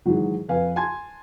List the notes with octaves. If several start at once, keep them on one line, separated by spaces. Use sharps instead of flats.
G#2 D#3 E3 F#3
F2 B4 F5 G#5
G#5 A5 C6 G#6